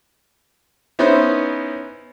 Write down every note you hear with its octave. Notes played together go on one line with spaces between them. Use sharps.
B3 C#4 D#4 E4 B4 C5